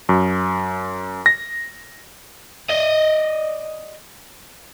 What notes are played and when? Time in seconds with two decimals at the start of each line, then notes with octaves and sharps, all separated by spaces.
0.09 F#2
1.26 A#6
2.70 D5 D#5